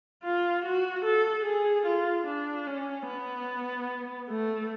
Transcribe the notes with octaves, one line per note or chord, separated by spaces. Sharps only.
F4
F#4
A4
G#4
F4
D4
C#4
B3
A3